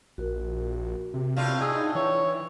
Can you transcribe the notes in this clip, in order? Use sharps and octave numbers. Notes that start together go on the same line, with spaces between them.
A#1 F#4 A#4
C3
A2 B3 D4 F4 F5
D#4 G#4 E6
E3 C#5